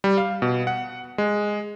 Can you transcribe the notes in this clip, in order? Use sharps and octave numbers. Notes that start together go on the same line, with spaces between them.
G3
F5
B2
F#5
G#3